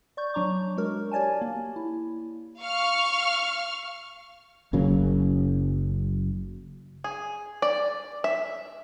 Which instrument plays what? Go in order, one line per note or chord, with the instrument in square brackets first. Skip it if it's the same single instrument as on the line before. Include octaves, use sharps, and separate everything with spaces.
[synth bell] D5 C#6 G6
F#3 D4 A#5 C#6 D6
G#3 F#4 A#4
G4 C#5 D5 G#5 A5
A#3
E4
[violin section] F5 C#6 F6
[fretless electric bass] F#1 C#3 F#3 A#3
[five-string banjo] G#4
D5
E5